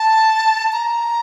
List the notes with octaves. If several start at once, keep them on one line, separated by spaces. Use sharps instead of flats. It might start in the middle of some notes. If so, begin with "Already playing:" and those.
Already playing: A5
A#5